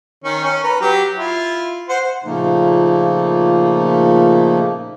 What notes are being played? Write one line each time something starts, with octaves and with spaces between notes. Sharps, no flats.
D#3 C#4
C#4
B4 A#5
F#3 G4
E4 F4
C5 F#5
A#2 C#3 F3 A3 A#3 D#4